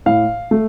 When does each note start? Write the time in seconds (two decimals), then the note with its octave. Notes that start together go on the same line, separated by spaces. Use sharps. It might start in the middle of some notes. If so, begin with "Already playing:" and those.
0.06 A2 F5
0.51 A3